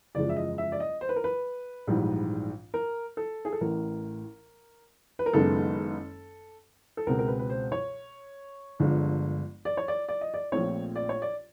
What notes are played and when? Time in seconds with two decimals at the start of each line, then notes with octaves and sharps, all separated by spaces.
0.15 F#1 E2 C#3 F3 G#3 D5
0.29 E5
0.36 D#5
0.58 E5
0.72 D5
0.80 D#5
1.01 C5
1.09 B4
1.16 A#4
1.24 B4
1.87 A#1 G#2 E3 G3
2.74 A#4
3.17 A4
3.45 G#4
3.53 A4
3.61 A1 A2 E3 A#4
5.19 B4
5.26 A#4
5.33 F#1 F#2 D#3 G#3 B3 A4
6.97 A4
7.07 C#2 B2 G#3 C4 A#4
7.19 A#4
7.28 B4
7.39 B4
7.50 C5
7.72 C#5
8.79 G1 G2 D3 F3 G#3
9.65 D5
9.77 C#5
9.88 D5
10.08 D5
10.21 D#5
10.34 D5
10.52 A#1 A#2 F3 A3 C4 C#5
10.96 D5
11.09 C#5
11.22 D5